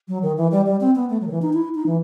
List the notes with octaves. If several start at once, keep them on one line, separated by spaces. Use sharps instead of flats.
F#3
D#3
E3
G3
G3
C4
B3
A3
F#3
D#3
E3
D#4
E4
D#4
E3